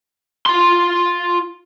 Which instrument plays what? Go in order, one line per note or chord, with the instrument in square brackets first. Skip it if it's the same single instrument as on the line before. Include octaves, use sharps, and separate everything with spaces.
[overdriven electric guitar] F4 C6